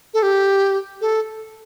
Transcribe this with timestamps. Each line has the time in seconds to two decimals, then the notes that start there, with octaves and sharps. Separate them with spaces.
0.14 A4
0.23 G4
1.01 A4